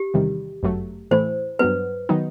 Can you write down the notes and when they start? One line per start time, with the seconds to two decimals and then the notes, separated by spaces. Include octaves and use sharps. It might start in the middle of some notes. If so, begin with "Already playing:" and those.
Already playing: G4
0.14 E2 C3 D#3 G3
0.63 G1 F#2 F#3 A3
1.11 A2 E3 A3 E4 C5
1.59 G2 F#3 B3 B4
2.09 D#3 F#3 B3 D#4